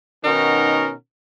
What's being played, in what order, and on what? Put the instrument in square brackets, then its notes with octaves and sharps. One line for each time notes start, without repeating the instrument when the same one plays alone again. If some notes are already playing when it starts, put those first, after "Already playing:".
[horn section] B2 D#3 C#4 D#4 F#4 A#4